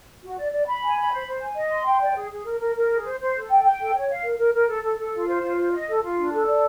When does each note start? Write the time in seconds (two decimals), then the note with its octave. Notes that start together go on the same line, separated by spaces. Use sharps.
0.23 F#4
0.39 D5
0.53 D5
0.68 B5
0.83 G#5
0.98 B5
1.12 C5
1.27 C5
1.42 G#5
1.57 D#5
1.72 C6
1.87 G5
2.01 D5
2.16 G#4
2.32 G#4
2.46 A#4
2.61 A#4
2.76 A#4
2.91 G#4
3.06 C5
3.20 C5
3.35 A4
3.50 G5
3.64 G5
3.80 A4
3.94 C#5
4.09 F5
4.24 A#4
4.38 A#4
4.54 A#4
4.68 A4
4.84 A4
4.98 A4
5.14 F4
5.28 C5
5.42 F4
5.57 C5
5.72 D#5
5.88 A4
6.03 F4
6.17 D4
6.32 A4
6.47 D5